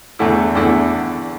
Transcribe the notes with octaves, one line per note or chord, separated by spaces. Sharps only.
E2 D3 A3 E4
E2 D3 A3 E4